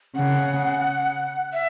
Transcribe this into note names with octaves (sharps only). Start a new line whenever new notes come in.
C#3 F#5
E5